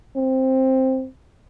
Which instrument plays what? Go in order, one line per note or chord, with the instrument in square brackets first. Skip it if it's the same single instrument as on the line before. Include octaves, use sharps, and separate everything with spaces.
[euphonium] C4